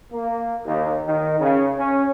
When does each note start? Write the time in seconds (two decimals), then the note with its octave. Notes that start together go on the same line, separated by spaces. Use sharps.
0.11 A#3
0.65 D#2
1.07 D#3
1.39 C#3
1.76 C#4